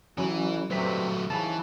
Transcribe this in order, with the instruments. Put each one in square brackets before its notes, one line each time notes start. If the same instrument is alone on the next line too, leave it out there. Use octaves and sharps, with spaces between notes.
[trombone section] A1 [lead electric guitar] E3 [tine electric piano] F#3 C#4
[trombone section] G2 C3 [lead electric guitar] F#3 A3 [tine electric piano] B4 B6
[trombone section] D#2 G#2 C#3 [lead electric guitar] E3 [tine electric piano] A5